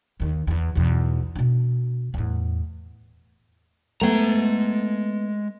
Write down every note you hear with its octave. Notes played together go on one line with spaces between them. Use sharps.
D#2 D#3
E2 E3
B1 E2
B2 D4
E2 A2
G#3 A3 B3 A#5